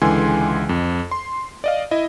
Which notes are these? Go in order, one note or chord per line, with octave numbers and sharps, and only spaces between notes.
C#2 D3 E3 G#3 G#5 C6
F2
C6
D5 D#5 F5
E4 D#5